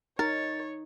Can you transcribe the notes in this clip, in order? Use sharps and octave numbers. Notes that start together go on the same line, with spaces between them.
D#4 A#4 C#5 A6